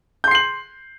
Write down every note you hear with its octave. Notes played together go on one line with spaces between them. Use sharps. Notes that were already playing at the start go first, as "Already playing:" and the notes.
C6 G6 C7 F#7